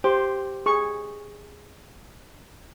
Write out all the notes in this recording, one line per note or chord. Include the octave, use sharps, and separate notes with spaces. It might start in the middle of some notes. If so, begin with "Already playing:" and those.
G4 C5
G#4 C#6